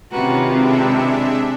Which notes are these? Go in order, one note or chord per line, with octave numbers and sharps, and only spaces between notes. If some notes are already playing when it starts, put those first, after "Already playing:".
C3 D#3 C#4 F4 F#4 B4 A#5
G#3 C4 D4 E5